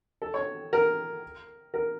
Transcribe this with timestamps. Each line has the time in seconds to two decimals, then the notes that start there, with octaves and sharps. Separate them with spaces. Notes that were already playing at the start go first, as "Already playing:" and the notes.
0.22 A4
0.34 C#5
0.73 A#4
1.74 A#4